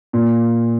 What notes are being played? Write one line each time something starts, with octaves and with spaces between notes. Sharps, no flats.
A#2